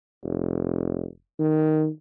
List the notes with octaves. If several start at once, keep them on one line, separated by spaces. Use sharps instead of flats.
F1
D#3